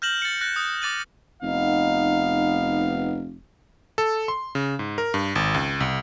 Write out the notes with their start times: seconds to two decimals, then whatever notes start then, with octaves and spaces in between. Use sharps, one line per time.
0.02 F6 G6 A#6 E7 F#7
0.22 A6 C#7
0.41 F#6 A6 A#6
0.56 D#6
0.82 D6 A6 D#7 F#7
1.43 F1 B3 D#4 F5
3.98 A4
4.28 C6
4.55 C#3
4.79 G#2
4.98 A#4
5.14 G2
5.35 G#1
5.54 C#2
5.80 C2